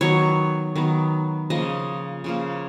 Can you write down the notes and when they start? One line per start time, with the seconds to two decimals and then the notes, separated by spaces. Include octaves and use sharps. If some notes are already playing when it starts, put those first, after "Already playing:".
0.01 D#3 F#3 B3 C#5
0.76 D#3 F#3 B3
1.50 C#3 F3 A#3 D#5
2.24 C#3 F3 A#3